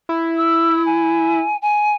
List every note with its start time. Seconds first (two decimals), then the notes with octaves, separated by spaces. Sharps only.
0.09 E4
0.36 E6
0.86 G#5
1.62 G#5